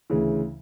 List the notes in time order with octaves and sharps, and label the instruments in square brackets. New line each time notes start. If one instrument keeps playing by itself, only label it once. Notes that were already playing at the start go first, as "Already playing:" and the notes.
[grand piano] D2 C#3 E3